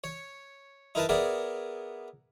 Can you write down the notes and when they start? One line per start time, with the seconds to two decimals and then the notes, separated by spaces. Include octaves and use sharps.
0.04 C#5
0.95 D#4 E4 A#4 B4 A5
1.09 B3 G#4 A#4 D5 E5